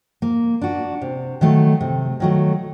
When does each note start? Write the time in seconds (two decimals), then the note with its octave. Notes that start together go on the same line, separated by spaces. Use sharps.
0.22 A#3
0.61 D4 F#4
1.01 C3
1.41 D#3 F#3 A3
1.81 C3
2.20 D#3 F#3 A3